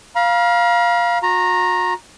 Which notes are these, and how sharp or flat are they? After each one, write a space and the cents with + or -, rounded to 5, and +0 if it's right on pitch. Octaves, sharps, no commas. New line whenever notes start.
F5 +0 A#5 +45
F#4 -40 A#5 +0